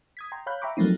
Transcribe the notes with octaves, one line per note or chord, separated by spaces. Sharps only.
D#6 G#6 B6
G5 A#5 C6
C#5 F5 B5 F#6 G6
E5 G5 A#5 B5 C#6 D6
F3 F#3 A3 A#3 C4 D#4